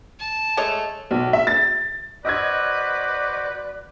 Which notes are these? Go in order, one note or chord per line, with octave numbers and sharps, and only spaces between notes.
A5
G#3 A3 C#5
B1
E5
A6
F#4 B4 C5 D5 D#5 D6 E6 G#6